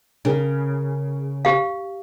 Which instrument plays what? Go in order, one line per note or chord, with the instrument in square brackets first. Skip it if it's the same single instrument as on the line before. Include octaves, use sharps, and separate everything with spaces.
[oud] C#3 [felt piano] C#4 G#4 A#4
[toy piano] G4 F5